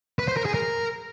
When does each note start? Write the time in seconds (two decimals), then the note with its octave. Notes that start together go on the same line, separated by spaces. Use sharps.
0.19 B4
0.28 C5
0.37 A#4
0.46 G#4
0.54 A#4